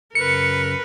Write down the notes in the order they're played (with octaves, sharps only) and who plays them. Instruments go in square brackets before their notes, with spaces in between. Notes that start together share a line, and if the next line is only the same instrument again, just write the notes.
[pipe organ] F#2 C#3 [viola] A#4 B4 [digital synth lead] C#7